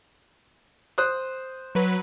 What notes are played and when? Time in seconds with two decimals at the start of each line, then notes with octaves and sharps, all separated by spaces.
0.98 C5 D#6 F#6
1.75 F#3 B4